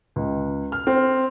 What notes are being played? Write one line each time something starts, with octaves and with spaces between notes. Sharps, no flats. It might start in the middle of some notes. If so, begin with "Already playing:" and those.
C#2
F6
C4